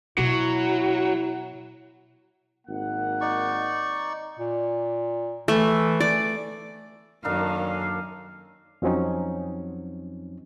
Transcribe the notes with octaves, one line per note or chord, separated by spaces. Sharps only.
B2 F#3 E4
G#1 A#3 F#5
D#4 D5 C#6
A#2
E3 A3
D5
F#2 D#3 A#3 D4 A4 F5
F2 F3 F#3 C4 C#4 D#4